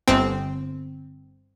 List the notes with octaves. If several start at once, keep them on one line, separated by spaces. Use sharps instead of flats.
G1 C4